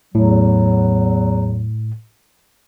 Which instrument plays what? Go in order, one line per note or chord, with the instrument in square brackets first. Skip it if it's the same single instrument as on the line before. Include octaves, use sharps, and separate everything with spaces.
[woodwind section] E2 F#3 [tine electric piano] A2